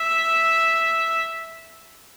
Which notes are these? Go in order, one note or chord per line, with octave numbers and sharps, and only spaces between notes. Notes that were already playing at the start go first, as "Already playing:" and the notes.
Already playing: E5